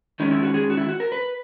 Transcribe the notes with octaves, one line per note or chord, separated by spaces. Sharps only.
D#3 G#3 C#4 D#4
E4
F#4
G#4
F#4
E4
F#4
A#4
B4